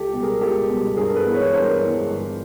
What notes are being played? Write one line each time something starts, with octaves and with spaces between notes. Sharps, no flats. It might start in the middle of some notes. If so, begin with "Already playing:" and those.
Already playing: C#2 G4 A4
B2 G3
G#4 A#4
C#2 G4 A4
B2 G3
G2 G#4 A#4
A4 B4
E3 G#3 B3
B4 C#5
G2 A#4 C5
E3 G#3 B3
G1